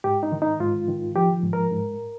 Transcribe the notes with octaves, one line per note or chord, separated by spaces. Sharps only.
G#2 G4
D#4
D#3
D#4
G#2 F4
D#3
F3 G4
G#2
A#4
G#2